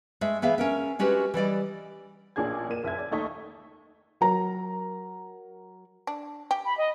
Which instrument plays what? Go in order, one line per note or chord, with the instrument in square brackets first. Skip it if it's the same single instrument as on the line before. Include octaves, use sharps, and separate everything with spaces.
[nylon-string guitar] G#3 A3 E5
E3 B3 G#4 E5 F5
C#4 A#4 E5
G#3 C#4 F#4 G4 B4
E3 G3 D5 D#5
[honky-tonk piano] A1 A#2 D4 G#4 G#6
A#2 A#3 D#7 E7
F#1 E5 G#6
D5
D#2 A3 D#4 C#6 B6
[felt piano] F#3 A#4 A#5
[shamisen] D4
G4
[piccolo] B5
D#5